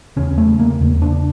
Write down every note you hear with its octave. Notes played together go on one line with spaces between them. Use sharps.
E2 C#3 C#4
A3
A#3
E2 C#3
D4